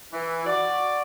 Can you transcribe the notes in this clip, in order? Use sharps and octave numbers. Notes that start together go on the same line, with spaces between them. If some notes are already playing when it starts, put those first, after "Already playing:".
E3
F#4 D5